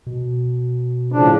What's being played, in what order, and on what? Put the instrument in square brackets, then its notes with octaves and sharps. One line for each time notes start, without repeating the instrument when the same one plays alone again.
[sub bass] B2
[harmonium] A2 C#3 F3 [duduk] D4